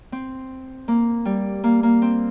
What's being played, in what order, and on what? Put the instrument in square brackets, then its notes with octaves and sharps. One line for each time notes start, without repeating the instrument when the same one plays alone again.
[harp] C4
A#3
G3
A#3
A#3
C4